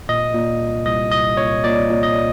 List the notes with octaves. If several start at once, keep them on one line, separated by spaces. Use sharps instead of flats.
A#2 D#5
A#2
C2
C2 D#5
C2 D#5
A#2 C#5
A#2 D5
A#2
D#5